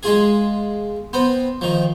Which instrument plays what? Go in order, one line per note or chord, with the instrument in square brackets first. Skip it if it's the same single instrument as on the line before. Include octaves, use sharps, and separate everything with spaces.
[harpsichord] G#3 F4 G#4
B3 C4
D#3 F3